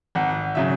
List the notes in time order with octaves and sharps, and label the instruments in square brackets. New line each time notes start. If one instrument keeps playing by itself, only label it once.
[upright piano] G#1 F#5
C#3 F#3 E5